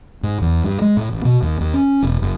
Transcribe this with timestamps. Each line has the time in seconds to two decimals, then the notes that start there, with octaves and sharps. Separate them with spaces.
0.23 G#2
0.42 E2
0.64 G2
0.82 G#3
0.97 A2
1.13 A1
1.25 B2
1.42 D#2
1.61 D#2
1.74 C#4
2.03 E1
2.22 F#1